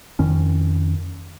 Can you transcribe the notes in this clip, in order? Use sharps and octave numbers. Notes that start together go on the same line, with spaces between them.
F2 D#3 C#4